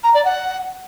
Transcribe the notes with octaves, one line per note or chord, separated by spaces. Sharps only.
A#5
D5
F#5